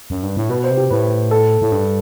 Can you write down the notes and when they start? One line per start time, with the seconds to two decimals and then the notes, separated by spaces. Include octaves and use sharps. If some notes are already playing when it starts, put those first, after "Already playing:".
0.10 F#2
0.23 G2
0.37 A2
0.49 B2 B4
0.64 C5
0.70 C3
0.77 G4
0.90 A2 B4
1.31 A4
1.61 A2
1.72 G2